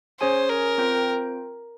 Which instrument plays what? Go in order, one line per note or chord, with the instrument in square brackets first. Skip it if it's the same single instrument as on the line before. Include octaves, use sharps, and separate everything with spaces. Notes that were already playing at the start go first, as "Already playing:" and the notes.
[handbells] C#4 G#4 C#5 G#5 [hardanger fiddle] C5
[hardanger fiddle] A#4
[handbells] C4 F4 C5 G5